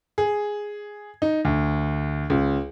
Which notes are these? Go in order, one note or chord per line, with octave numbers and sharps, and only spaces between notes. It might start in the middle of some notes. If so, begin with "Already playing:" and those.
G#4
D#4
D2
C#2